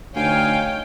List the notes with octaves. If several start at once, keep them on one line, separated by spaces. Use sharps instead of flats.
D2 D#4 C#5 F5 G5 G#5